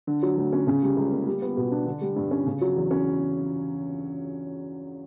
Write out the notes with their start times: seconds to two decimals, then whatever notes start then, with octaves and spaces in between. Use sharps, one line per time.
0.07 D3
0.23 F#3
0.37 D2
0.53 C#4
0.67 C#3
0.83 G3
0.97 C#2
1.12 A#3
1.26 G3
1.42 B3
1.57 B2
1.72 D4
1.87 D3
2.01 G3
2.16 G2
2.31 C#4
2.46 C#3
2.61 F#3
2.76 E2
2.91 C#4